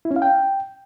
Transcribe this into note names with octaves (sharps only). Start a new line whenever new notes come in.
E4
C#4
F5
G5